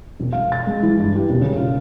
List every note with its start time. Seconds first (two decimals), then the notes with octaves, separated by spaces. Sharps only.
0.20 E1
0.33 F5
0.52 A6
0.67 G#3
0.83 E3
0.99 G2
1.16 G4
1.30 E1
1.41 C#3
1.56 F4